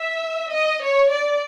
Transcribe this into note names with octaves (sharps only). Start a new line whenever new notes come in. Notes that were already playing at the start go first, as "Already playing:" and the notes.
Already playing: E5
D#5
C#5
D5